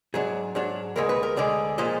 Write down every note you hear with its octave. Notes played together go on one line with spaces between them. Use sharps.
G#2 F#3 D4 G#4
G#2 F#3 D4
D2 D3 G#3 A#4
B4
A#4
D2 D3 G#3 D5
A#2 F3 G#3 D#5